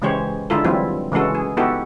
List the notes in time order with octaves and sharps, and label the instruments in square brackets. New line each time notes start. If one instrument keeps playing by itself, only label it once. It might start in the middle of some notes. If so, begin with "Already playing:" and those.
[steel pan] C#3 E3 G#3 G4 C5 C#5
D3 G#3 E4 F4 A4
E3 F#3 G3 C4 E4 F4
C#3 E3 G#3 F#4 A4
G#4
B3 D#4 E4 F#4 G4 A4